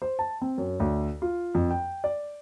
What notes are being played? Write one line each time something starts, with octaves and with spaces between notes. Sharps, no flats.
C5
A5
C4
F#2
D2
F4
F2
G5
D5